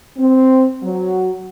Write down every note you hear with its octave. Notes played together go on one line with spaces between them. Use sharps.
C4
F#3